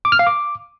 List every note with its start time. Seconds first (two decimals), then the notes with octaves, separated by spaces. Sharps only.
0.05 D6
0.12 F6
0.19 F5
0.27 D6